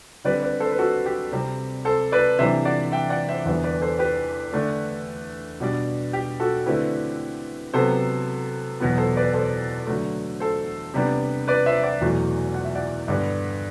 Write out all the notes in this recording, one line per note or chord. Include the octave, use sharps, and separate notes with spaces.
D3 G3 C4 B4 D5
B4 D5
A4 C5
B4
F#4 A4
G4
C3 G3 C4
A4 C5
B4 D5
C3 E3 G3 D4 C5 E5
D5 F#5
E5 G5
D5 F#5
C5 E5
E2 D3 G3 B3 C5 E5
B4 D5
A4 C5
G4 B4
D3 A3 D4
B2 G3 D4
G4
F#4 A4
D3 A3 C4 E4 G4 B4
C3 F#3 B3 A4 C5
E2 B2 F#3 B3
A4 C5
B4 D5
A4 C5
D3 F#3 A3
A4 C5
C3 G3 B3 D4
B4 D5
C5 E5
D5 F#5
E2 B2 F#3 A3 E4
F#5
E5
D5 F#5
G2 D3 G3 B3